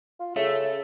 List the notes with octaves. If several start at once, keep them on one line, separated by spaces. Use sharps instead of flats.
F4
C#3 A4 E5